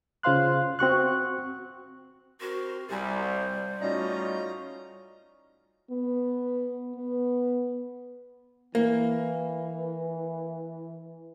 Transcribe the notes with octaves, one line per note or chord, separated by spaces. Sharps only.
C#3 F4 C5 F5 C6 F#6
C4 F#4 C#6 F#6
C4 F#4 A#4 C6
C2 G3 G4 C5 G#5
A2 C#4 D#4 F4 F#4 D5 D#5 A#5
B3
B3
E3 A#3